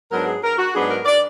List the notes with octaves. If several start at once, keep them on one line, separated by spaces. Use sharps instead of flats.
G#2 F#3 B3 D4 A#4
G#4
A#4
F#4
G#2 F#3 B3 D4 G#4
A#4
D5